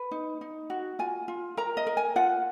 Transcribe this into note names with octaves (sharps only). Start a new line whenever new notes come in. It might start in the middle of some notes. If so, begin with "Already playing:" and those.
Already playing: B4
D#4
D#4
F#4
F4 G#5
F4
A#4 A#5
D#5
A#4
G#5
F4 F#5